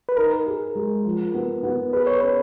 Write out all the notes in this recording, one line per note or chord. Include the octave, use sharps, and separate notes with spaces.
B4
D#4 A#4
G#4
G#3
F3
B3
B3
G#4 B4
C#5
C#4 B4